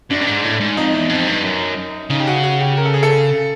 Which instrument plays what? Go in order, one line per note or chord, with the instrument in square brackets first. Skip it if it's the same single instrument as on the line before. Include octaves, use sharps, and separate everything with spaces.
[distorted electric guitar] F#2 [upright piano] D4
[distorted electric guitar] G2
G#2
A2
G#2
[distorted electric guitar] F2 [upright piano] D#4
[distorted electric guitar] E2
F2
G2
F#2
[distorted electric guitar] C#3 [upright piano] D#4
[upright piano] G4
F#4
F#4
G4
A#4
A4
G#4
A4